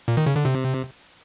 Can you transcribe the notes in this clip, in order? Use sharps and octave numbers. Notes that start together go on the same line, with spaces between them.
A#2
D#3
C#3
D3
C3